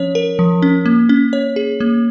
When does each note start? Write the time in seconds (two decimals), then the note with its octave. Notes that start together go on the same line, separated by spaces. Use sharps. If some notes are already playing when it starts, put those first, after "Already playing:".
Already playing: F3 C#4 C#5
0.15 A#4
0.39 F3
0.62 C#4
0.86 A#3
1.09 C#4
1.33 C#5
1.56 G#4
1.80 A#3